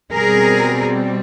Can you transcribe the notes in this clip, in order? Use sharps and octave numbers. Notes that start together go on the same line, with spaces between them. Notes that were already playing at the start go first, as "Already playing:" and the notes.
B2 G3 C4 G#4 A#4